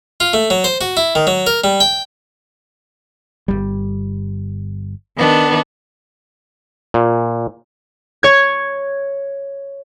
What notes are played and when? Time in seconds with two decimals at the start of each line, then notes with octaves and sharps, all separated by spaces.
0.20 F4
0.33 A3
0.50 F#3
0.64 C5
0.81 F#4
0.97 E4
1.15 D#3
1.27 F#3
1.47 A#4
1.64 G3
1.80 G5
3.48 G1 D#2 G3
5.17 D#3 B3 D4
6.94 A#2
8.23 C#5 G#6